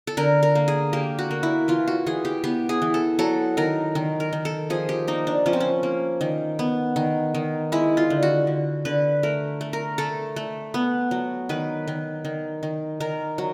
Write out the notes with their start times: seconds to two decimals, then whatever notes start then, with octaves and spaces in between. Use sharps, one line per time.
0.07 A4
0.17 D3 A#4
0.43 A#4
0.55 A#3
0.68 G#4
0.93 A#3 G4
1.19 F#4
1.31 A#3
1.43 E4
1.68 E3 F4
1.87 F#4
2.06 E3 G#4
2.25 G4
2.44 B3 G4
2.69 G#4
2.82 E3
2.94 A4
3.19 F#3 A4
3.57 D#3 A#4
3.95 D#3
4.20 A#4
4.33 D#3
4.45 A4
4.70 F3 G#4
4.89 G4
5.08 A#3 D#4
5.27 D4
5.46 F3 C#4
5.53 C4
5.60 C#4
5.83 A#3
6.21 D#3
6.59 B3
6.96 D#3
7.34 D#3
7.72 G#3 E4
7.97 F4
8.10 D3
8.23 F#4
8.47 D3
8.85 D3 B4
9.23 A3 A#4
9.61 A3
9.73 A#4
9.98 A3 A4
10.36 A3
10.74 B3
11.11 F#3
11.49 D#3 B4
11.88 D#3
12.25 D#3
12.63 D#3
13.00 D#3 A#4
13.38 F#3